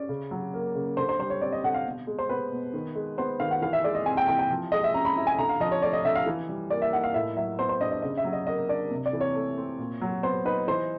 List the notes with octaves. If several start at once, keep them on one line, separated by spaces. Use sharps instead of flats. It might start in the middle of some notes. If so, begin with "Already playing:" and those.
Already playing: C#4 D5
C#3
F#3
A#3
C#3
D3 C5
C5
G3 C5
C#5
C4 D5
D#5
D3 F#5
F5
B2
G#3
C5
B3 B4
B2
D#3
G#3
B3 C5
D#3 F5
F#5
E3 F5
E5
G#3 D5
D#5
C4 G#5
G5
E3 G5
G5
F3
G#3 D#5
E5
C#4 A#5
B5
E4
G#5
D3 A#5
F5
F3 D#5
C#5
A3 D5
D#5
D3 E5
F5
E3
G3
A#3 D5
E5
D#4 F#5
F5
A2 E5
F#3 E5
B3 C5
C5
D4 D#5
D#5
C#3 D#5
E5
F#3
D#5
A#3 D#5
D4 D5
C3
D5
E3
C#5
A3
C4
A#2
F#3
B3 C5
D#4 B4
E3 C5